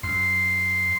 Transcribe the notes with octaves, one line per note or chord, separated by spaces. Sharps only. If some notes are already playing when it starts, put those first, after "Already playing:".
F#2 C6